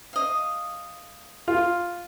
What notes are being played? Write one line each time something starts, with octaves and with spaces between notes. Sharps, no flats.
D#5 F5
F4